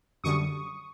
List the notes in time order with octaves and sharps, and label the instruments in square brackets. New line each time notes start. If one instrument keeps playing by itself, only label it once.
[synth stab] F#2 D3 G3 C#6 D#6